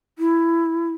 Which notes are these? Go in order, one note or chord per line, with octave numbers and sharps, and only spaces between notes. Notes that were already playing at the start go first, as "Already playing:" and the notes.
E4